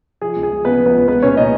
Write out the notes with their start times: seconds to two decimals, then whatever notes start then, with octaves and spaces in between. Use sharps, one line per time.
0.22 F3 G#4
0.36 C#2
0.43 G#4
0.50 G#3
0.65 C#3 B3 B4
0.79 F3
0.86 B3 B4
0.94 C#2
1.08 G#3 B3 B4
1.22 A#2 C#4 C#5
1.37 A#2 D#4 D#5